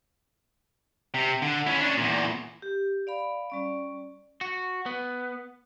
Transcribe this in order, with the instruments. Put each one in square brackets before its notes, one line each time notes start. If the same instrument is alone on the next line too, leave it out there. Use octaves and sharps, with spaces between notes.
[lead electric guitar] C3
D3
C#4 E4
C#4 D4
E2 A#2
[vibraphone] G4
D5 F5 B5
G3 C#4 D5
[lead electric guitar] F#4
B3